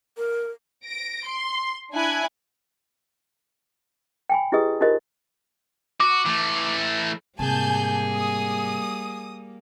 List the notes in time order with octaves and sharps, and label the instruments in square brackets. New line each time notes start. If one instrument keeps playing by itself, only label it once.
[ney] A#4
[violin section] A#6 D7
C6
D4 E4 G#5 F#6 G#6
[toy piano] G5 G#5 B5
E4 G4 G#4 B4 D#5 D#6
D#4 F4 G4 A#4 C5 D#5
[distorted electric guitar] F#4 [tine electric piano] D6
[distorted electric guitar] E3 A3
[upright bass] G#2 C3 [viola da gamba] G3 A#3 [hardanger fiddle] G#4 [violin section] G#5 A5 G6
[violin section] D#6